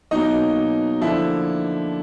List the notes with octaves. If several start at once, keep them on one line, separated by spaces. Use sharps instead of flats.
B2 F#3 A#3 D#4 D#5
D3 F3 A#3 E4 E5